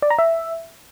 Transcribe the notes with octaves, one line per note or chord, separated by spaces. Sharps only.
D5
A#5
E5